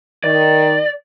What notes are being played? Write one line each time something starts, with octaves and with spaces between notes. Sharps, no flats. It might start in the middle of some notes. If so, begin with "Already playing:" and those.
D#3 D5